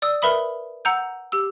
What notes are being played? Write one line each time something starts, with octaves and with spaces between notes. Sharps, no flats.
D5 D#6 E6
A#4 B4 E5 B5 D#6
F#5 A#5 E6 G6
G4 E6